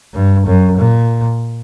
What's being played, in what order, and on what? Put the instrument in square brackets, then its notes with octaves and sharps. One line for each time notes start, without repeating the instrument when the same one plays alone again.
[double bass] G2
F#2
A#2